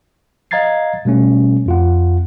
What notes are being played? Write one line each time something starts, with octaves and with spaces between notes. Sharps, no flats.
D#5 F5 A#5 G#6 A6 C7
B2 G3 A3 C#4
F2 F4 F#5